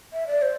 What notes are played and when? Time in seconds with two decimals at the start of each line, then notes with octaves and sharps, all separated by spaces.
0.13 E5
0.27 D5
0.42 C5